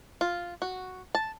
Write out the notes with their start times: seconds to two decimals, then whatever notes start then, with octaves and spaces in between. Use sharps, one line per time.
0.21 F4
0.62 F#4
1.15 A5